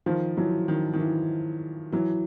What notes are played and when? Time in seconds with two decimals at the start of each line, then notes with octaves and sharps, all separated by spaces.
0.06 D#3 F3
0.37 E3 F#3
0.68 D#3
0.93 D#3
0.99 E3
1.92 E3 F#3